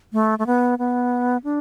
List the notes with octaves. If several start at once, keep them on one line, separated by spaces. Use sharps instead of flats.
A3
A3
B3
B3
D4